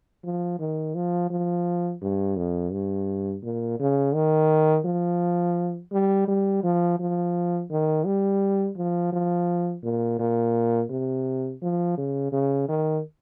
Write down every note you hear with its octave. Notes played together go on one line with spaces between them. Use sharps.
F3
D#3
F3
F3
G2
F2
G2
A#2
C#3
D#3
F3
G3
G3
F3
F3
D#3
G3
F3
F3
A#2
A#2
C3
F3
C#3
C#3
D#3